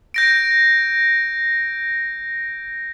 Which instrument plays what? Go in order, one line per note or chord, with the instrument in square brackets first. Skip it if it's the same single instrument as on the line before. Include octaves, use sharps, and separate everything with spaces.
[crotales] G6 A#6 D7